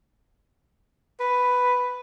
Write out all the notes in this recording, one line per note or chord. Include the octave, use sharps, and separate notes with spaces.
B4